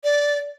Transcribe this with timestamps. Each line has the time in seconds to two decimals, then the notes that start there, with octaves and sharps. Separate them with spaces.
0.04 D5